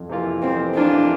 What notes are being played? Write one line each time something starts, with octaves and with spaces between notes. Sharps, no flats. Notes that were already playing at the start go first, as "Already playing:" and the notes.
Already playing: F2
C3 E3 A#3 F4
F2 C4
C3 E3 A#3 D4 F4